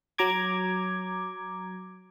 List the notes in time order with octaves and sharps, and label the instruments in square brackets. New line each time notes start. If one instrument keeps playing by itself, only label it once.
[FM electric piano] F#3 A#5 D6 G#6